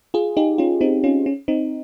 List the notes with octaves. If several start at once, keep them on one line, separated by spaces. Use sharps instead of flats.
F4 G#4
D#4 G4
C#4 F4
C4 D#4
C#4 F4
C#4
C4 D#4